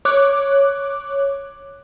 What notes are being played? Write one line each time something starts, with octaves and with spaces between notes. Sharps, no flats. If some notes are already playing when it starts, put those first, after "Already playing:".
C#5 D6 F#6